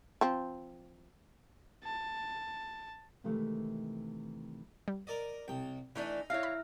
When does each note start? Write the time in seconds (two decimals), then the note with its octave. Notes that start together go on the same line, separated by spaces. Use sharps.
0.21 F3 C4
1.84 A5
3.24 C3 D#3 E3 G#3 A3
4.88 G3
5.07 A#4 D5 D#5
5.48 C2 G5
5.96 E3 A3 D4 D#4 D#5
6.30 E4 C#5 E5 F5 F6
6.43 B5